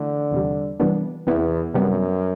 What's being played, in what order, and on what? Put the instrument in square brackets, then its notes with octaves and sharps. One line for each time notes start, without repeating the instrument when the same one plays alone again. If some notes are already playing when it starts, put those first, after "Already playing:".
Already playing: [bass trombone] D3 [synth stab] E3 A3
[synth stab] E2 C3 G3
C3 E3 G3 B3 D4
[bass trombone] E2 [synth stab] C3 E3 B3 E4
[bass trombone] F#2 [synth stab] C3 G3 B3